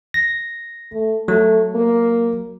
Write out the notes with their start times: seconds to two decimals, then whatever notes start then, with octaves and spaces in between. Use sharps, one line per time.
0.14 A#6
0.92 A3
1.28 F#3 A3
1.75 A#3